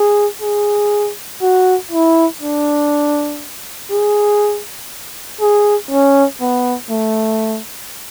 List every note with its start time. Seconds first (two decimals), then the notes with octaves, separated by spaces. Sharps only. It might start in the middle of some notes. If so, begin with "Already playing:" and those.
Already playing: G#4
0.42 G#4
1.42 F#4
1.91 E4
2.42 D4
3.91 G#4
5.41 G#4
5.91 C#4
6.41 B3
6.90 A3